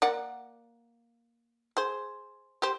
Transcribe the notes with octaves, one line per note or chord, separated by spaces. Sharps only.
A#3 D5 F#5
G#4 C5
G4 C5